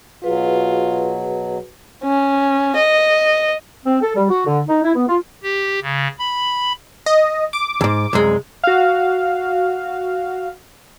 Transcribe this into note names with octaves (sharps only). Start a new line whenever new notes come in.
B2 F#3 F4 F#4 G#4 B4
C#4
D#5
C4
A4
G3
F#4
D3
D#4
E4
B3
F4
G4
C#3
B5
D#5
D6
D2 G#2
C2 F#2 G#3
F#4 F5